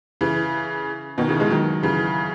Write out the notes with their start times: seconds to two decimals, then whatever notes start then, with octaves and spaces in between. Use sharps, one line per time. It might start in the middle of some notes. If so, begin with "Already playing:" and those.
0.21 C#3 E3
1.18 B2 D#3
1.29 C#3 E3
1.40 E3 G#3
1.50 D#3 F#3
1.83 C#3 E3